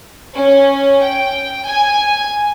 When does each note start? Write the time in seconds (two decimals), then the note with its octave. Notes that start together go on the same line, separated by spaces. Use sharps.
0.34 C#4
1.02 G5
1.66 G#5